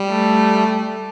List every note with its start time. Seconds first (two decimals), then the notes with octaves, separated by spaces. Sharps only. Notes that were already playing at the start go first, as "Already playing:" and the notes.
Already playing: G3
0.09 A3